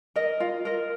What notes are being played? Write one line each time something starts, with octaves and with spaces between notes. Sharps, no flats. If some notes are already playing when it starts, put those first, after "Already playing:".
A#4 D#5
F4
A#4 D#5